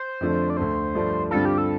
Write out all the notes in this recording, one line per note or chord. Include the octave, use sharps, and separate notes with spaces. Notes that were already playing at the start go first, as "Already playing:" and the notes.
Already playing: C5
F2 D3 F3 A3 D4
D5
D2 D3 A3 C5
G2 F3 A3 D4
G2 D3 G3 C4 F4 A4
G4
A4